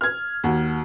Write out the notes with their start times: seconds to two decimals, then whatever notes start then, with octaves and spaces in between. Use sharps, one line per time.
0.01 F6 G#6
0.44 D#2 F#4